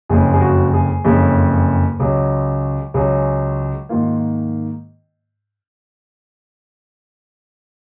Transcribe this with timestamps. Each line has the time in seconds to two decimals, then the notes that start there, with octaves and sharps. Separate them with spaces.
0.09 F#1 F2 C#3 G#3 G#4
0.33 G#4
0.41 F#4
0.74 G#4
1.04 F#1 F2 C#3 G#3
2.00 C#2 C#3 F#3
2.94 C#2 C#3 F#3 G#4
3.89 G#2 D#3 A#3 F4